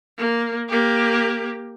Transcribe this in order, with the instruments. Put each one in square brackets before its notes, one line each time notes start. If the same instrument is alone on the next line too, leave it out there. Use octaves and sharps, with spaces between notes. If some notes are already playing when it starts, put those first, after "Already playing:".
[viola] A#3
A#3 G4